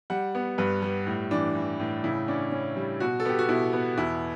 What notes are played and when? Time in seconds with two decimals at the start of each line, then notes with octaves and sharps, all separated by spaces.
0.10 G3 F#5
0.35 B3
0.58 G2 B4
0.82 G3
1.06 A2
1.31 E3 D4
1.55 E3
1.80 A2
2.04 C#3 E4
2.28 C#4 D4
2.52 C#4
2.76 G3
3.00 B2 F#4
3.20 A4
3.25 B3 G4
3.39 F#4
3.49 B2 E4
3.73 B3
3.98 E2 E4